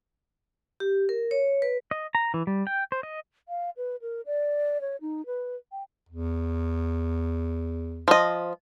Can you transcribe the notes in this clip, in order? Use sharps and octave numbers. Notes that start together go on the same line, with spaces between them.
G4
A#4
C#5
B4
D#5
A#5
E3
G3
G5
C5
D#5
F5
B4
A#4
D5
C#5
D#4
B4
G5
E2
F3 D#5